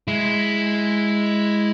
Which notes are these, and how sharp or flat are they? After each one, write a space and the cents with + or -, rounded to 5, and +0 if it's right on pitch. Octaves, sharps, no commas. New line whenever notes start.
G#3 +0 E4 +0